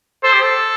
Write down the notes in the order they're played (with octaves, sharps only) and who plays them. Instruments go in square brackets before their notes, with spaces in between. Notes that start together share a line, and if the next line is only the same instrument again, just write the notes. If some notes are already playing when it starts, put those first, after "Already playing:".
[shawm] A4 [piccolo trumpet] C5
[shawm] G4
A4